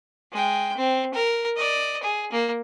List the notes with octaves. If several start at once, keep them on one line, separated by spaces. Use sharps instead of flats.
G#3 G5
C4
A#4
D5 D#5
G#4
A#3